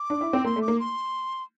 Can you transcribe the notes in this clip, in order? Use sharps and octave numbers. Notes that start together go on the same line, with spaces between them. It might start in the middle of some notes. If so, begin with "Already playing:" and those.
Already playing: D6
D4
E4
C4
A#3 C6
A3
D6
A#3
C6